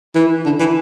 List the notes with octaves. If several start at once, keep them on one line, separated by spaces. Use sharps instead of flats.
E3
D3
E3